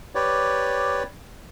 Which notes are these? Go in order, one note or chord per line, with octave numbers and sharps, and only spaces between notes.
G4 B4 C#5 D5